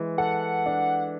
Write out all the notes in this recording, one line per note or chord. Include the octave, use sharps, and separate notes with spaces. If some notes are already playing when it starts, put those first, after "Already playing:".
Already playing: E3 G#3
A4 F#5
D4